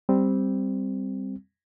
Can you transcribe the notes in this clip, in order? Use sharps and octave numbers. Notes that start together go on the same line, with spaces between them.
G3 C4